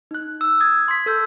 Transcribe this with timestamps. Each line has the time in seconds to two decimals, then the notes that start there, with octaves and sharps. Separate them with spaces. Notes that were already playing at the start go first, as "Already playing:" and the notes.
0.11 D#4 F#6
0.41 E6
0.60 D#6 G#6 A6
0.88 C6 G#6 B6
1.06 A4 E6 G6